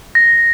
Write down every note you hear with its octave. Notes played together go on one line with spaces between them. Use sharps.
A#6